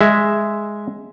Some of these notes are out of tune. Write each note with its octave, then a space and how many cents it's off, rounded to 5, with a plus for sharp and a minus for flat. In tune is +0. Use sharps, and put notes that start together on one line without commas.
G#3 +0 E5 +0